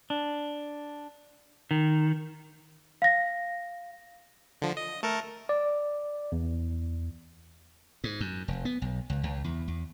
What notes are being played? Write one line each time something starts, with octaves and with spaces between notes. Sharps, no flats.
D4
D#3
F5 A#6
D3 F3
D#5
A3 A4 A#4
D5
E2
G#2
F#2
F1
B3
B1
C#2
C#2
E2
E2